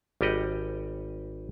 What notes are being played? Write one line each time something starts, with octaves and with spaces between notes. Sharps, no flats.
G#1 G3 G4 D#5 F#5